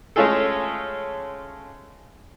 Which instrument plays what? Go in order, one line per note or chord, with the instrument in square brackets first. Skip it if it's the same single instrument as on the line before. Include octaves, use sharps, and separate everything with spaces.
[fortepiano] G#3 A3 C#4 F4 G#4 A4